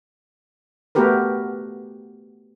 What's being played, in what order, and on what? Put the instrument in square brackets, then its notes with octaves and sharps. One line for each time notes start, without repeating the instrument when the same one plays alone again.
[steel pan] A3 B3 F#4 G4 A#4 B4